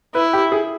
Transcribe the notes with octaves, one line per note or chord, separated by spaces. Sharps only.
E4 B4
G4
G#4